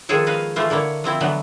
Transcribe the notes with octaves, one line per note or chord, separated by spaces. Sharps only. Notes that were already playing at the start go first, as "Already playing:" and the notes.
D#3 F3 G#3 G#4 A4 C#5
B4 D#5 F5
E3 A3 F4 C5
D3 A#3 E4 C#5
F3 C4 E4
B2 D3 E3 F#3 B3